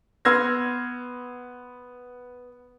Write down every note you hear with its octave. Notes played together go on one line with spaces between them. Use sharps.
B3 C6 E6 F6 G#6 A#6